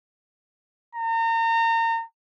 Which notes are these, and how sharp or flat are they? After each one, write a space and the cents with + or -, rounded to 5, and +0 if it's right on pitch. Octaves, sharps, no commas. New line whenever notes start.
A#5 -35